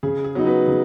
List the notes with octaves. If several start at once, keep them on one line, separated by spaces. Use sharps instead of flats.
C#3 G#4
G#4
F#3 B3 D#4
F#4 B4
C#3